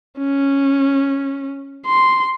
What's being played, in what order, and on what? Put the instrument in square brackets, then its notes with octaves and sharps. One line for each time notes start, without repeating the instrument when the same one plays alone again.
[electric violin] C#4
C6